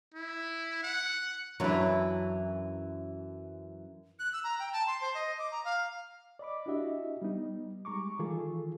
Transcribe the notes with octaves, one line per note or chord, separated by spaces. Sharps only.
E4
F#5
F#2 E3 F#3 D4 E4
F#6
E6
A#5
G5
A5
C6
C5
D#5
D6
A#5
F5
D5 D#5 B5 D6
D4 E4 F#4 G4 D#5 E5
G3 B3 D#4
G3 G#3 A#5 C#6 D6
D#3 E3 F4 G#4 A4